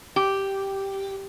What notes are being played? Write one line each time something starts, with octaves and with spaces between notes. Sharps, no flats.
G4